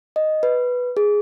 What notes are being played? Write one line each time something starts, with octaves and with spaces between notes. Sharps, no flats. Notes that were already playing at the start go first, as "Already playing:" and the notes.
D#5
B4
G#4